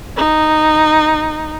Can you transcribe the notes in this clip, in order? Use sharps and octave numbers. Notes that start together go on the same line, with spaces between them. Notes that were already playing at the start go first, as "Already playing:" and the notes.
D#4